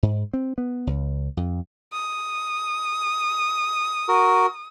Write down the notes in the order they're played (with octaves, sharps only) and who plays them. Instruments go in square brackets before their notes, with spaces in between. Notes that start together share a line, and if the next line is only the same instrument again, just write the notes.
[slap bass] G#2
C4
B3
C#2
F2
[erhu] D#6
[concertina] F#4 A#4